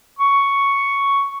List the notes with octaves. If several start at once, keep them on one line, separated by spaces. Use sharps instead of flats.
C#6